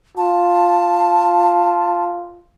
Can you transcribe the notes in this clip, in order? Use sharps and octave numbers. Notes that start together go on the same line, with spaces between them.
F4 A5